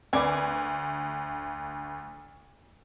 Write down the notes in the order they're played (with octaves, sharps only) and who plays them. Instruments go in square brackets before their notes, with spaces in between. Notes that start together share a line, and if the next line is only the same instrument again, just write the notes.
[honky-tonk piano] D2 [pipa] B4 D5 G#5